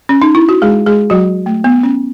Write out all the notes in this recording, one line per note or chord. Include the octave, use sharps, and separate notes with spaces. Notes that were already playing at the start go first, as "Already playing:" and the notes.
C#4
D#4
E4
F#4
G#3 G#4
G#3 G#4
F#3 F#4
A3
B3
C#4